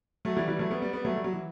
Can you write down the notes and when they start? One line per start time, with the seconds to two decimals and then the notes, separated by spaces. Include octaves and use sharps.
0.25 F#3 A3
0.37 E3 G3
0.48 E3 G3
0.59 F#3 A3
0.70 G3 B3
0.82 G3 B3
0.93 G3 B3
1.05 F#3 A3
1.16 G3
1.24 F#3
1.33 E3